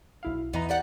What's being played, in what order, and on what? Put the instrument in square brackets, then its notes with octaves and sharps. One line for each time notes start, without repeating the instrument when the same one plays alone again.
[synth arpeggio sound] B1 E4 F5
[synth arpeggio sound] E2 E3 A#5 [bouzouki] B3 D#4
[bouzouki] G4 D5 F#5